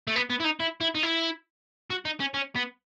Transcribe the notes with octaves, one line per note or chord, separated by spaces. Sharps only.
A3
B3
B3
E4
D#4
E4
E4
D#4
E4
F#4
D#4
C#4
C#4
B3